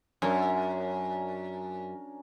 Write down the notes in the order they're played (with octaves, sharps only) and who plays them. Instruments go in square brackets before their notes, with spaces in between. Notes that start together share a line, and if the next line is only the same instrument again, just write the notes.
[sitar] F#2 [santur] C#4 D4 A#4